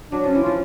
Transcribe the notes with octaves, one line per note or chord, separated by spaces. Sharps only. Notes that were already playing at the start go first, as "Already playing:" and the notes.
F#3 D4
F3 C#4
E3
F3 F4